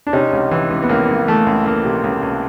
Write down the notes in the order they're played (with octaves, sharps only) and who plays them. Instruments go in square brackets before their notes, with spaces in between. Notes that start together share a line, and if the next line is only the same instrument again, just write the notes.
[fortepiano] D4
C3 C#4 D#4
C#2
E3
C#2
B3
C#2 A#3
C#2
E3 A3
C#2
C#2 A#3
C3
C#2
C#2